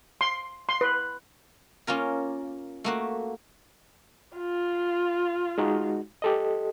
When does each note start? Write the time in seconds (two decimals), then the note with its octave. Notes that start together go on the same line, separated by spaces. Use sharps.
0.21 C6
0.69 C6
0.81 B4
1.87 A#3 C#4 F4 A#4
2.84 A3 A#3 F#4
4.37 F4
5.58 G#3 D#4 F#4
6.22 G4 A4 D#5